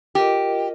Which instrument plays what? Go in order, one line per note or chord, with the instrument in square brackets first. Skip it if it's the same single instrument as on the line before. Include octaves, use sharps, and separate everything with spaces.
[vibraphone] F4 A#4 D#5 [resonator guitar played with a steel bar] G4